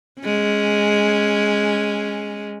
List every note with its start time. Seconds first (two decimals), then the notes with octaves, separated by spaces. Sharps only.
0.21 G#3 C#4